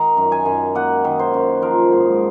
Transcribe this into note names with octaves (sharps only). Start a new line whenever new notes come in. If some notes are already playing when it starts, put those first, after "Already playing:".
Already playing: D#3 A#5
F#2
G#5
F#2
A#3 F#5
D#3
C5
F#2
F3 A#4
G#2 C5